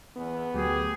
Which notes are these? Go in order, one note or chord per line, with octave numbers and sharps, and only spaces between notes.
E2 B3
D2 F#3 A3 G4 G#4